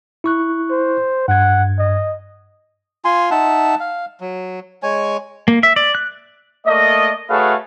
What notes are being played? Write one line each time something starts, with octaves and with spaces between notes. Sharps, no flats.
E4 C#6 F#6
C5
G2 F#5 G#6
D#5
F4 G#5 C6
D#4 E5 F#5 A5
F5
F#3
G#3 C#5 G#5
A#3
E5
D5
F#6
A3 A#3 D5 D#5
A3 F#4 G#4 B4 C#5 F5